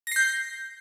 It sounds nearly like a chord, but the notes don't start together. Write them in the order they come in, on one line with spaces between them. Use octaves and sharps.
A#6 C7 G6